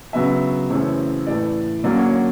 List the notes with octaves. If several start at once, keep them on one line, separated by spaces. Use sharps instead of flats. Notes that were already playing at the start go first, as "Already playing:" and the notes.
C#3 F#3 B3 D4 E5
F#2 C#3 E3 A3 C4 C#5
A2 E3 A3 D5
D3 F#3 A#3 C#4 D5
C#5